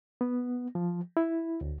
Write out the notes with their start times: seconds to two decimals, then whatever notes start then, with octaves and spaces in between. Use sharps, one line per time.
0.21 B3
0.75 F3
1.17 E4
1.61 D2